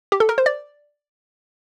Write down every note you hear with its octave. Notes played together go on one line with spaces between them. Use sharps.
G4
A4
A#4
C5
D5